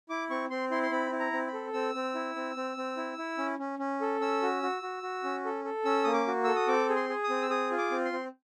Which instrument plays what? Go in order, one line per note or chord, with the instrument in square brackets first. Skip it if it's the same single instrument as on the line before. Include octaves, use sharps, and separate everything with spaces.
[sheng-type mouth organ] E4 D6
C4 C#6
C4 C6
E4 C6
C6
C4 B5
E4
A#5
C4
B5
A4
C4 E6
C4
E4
C4
C4
C4
E4
E4
C#4
C#4
C#4
A4
C#4 E6
F#4
F#4
F#4
F#4
C#4
A4
A4
C#4 E6
A#3 D#6
D6
F#4
A4 E6
D#6
C4 D6
G#4
C6
G#4
D#6
C4
E6
G#4 D#6
F4
D6
C4
C6
C4